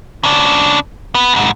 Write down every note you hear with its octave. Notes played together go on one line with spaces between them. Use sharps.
C#3 D4
B3
C2 G#2